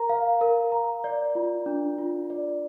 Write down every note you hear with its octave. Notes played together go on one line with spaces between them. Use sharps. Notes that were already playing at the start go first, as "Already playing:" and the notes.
Already playing: A#4 A#5
F5
A#4
A#5
D5
F4
D4
F4
D5